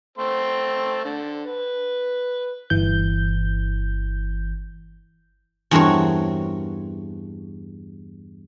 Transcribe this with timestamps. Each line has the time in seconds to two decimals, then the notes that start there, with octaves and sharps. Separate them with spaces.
0.18 A3 C4 C6
1.05 D3
1.45 B4
2.70 G1 E3 G6
5.71 E2 G2 C4 F#4 A#4 C#5